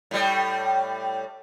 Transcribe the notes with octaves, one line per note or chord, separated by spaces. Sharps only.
A2 G3